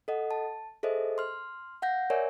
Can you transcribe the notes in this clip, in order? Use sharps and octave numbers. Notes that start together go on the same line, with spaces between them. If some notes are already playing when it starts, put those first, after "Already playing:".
A4 D#5 F#5
A5
G#4 A4 C5 D#5 E5
C6 F6
F5 F#5 G6 A#6
A#4 C#5 D5 E5 G#5